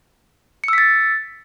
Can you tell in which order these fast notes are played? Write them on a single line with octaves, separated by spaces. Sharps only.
C#7 E6 B6 A6